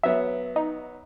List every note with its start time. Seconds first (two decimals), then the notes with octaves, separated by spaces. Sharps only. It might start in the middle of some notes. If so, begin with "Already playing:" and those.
0.03 F#3 B3 E5
0.56 D#4